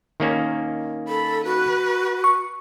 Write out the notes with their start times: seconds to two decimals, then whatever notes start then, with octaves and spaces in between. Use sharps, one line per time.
0.20 D#3 A#3 C#4
1.09 A4 B5
1.45 F#4 B4
2.24 C#6